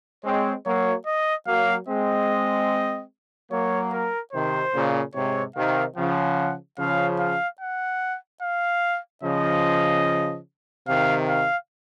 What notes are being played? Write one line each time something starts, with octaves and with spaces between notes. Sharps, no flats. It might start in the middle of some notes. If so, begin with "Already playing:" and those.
G#3 C4 C#5
F#3 A#3 C#5
D#5
F#3 A#3 F5
G#3 C4 D#5
F#3 A#3 C#5
A#4
C3 D#3 C5
A#2 C#3
G#2 C3 C#5
C3 D#3 F5
C#3 F3 F#5
C#3 F3 F5
F5
F#5
F5
C#3 F3 D#5
C3 D#3 F5
F5